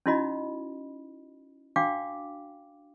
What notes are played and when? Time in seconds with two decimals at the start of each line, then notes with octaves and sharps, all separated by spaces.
0.06 C#4 D#4 E4 F#4 D#5 B5
1.76 D4 F#4 F5 G5 D6